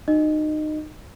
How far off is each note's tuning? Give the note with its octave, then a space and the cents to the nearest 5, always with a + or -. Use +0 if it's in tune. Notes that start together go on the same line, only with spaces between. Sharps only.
D#4 -25 F#4 +0 D#5 -15